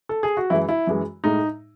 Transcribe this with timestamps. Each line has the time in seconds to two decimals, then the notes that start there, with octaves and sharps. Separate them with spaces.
0.09 A4
0.23 G#4
0.37 F#4
0.50 F#2 E3 G#3 E4
0.69 E4
0.87 F#2 E3 G#3
1.24 A2 G#3 D#4